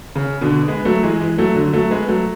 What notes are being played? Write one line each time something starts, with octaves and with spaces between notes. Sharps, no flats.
C#3
B2 D3
G#3 B3
F#3 A3
E3 G#3
E3 G#3
F#3 A3
D3 F#3
F#3 A3
G#3 B3
F#3 A3